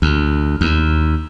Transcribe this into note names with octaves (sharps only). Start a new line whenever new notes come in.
D2
D#2